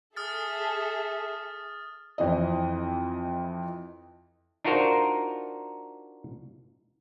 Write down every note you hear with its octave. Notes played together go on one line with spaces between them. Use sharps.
G#4 A4 E5 D#6 F6 A6
F2 E3 C4 D#5
D4 D#4 F4 F#4 A#4 C5